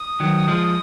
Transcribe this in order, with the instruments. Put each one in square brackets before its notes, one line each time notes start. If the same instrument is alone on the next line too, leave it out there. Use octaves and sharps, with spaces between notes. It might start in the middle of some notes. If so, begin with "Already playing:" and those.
Already playing: [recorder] D#6
[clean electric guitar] D#3 F#3
F3 G#3